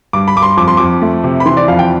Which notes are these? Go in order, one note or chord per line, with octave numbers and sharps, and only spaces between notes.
G2 D6
B5
G2 D6
C6
F2 D6
C6
F2 D6
A3
C3
B5
E3 C6
D5
F2 F5
G5